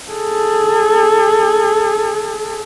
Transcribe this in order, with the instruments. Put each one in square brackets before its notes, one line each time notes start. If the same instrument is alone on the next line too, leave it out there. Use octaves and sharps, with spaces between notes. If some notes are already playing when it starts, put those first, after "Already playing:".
[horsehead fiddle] G#4 A4